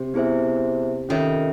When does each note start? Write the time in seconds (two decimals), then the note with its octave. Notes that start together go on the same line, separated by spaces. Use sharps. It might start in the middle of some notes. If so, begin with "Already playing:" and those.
Already playing: C3
0.14 B3 E4 G#4 C5 E5
1.09 D#3 C#4 F4 A4 C#5 E5